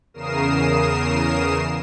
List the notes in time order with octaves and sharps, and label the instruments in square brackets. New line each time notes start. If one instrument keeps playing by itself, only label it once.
[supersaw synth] E2 C#3 A#4 D#6 C7 E7